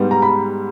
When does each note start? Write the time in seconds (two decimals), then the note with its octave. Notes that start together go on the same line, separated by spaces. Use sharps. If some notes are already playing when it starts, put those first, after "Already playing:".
Already playing: G#2 G3 B3
0.11 A#5
0.22 B5